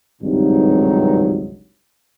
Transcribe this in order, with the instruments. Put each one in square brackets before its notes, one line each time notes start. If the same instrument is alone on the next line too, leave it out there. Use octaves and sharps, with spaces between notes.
[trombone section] G#1 C#2 G2 C3 F#3 D#4